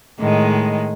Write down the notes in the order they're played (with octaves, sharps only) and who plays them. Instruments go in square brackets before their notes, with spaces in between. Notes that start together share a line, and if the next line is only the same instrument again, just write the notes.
[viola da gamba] A2 D#3 G#3